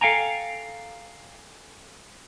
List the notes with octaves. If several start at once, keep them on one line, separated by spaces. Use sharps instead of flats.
A4 F5 G5 G#5 A#5